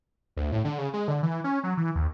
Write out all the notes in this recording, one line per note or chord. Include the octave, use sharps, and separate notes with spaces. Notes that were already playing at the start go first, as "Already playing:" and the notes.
D2
A2
D3
C#3
G#3
D3
E3
C#4
F#3
E3
D#2